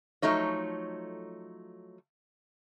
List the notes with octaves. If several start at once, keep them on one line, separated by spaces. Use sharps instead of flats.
F3 F#3 A3 D#4 C#5